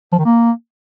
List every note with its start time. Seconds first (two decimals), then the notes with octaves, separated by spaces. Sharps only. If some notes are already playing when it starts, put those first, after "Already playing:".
0.12 F3
0.19 D#3
0.25 A#3